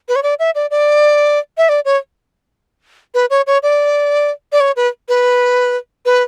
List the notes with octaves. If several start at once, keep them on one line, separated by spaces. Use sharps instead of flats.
B4
C#5
D5
E5
D5
D5
E5
D5
C#5
B4
C#5
C#5
D5
D5
C#5
B4
B4
B4